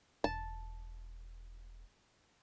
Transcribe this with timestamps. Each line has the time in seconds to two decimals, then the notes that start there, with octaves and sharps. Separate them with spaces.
0.24 E1 A5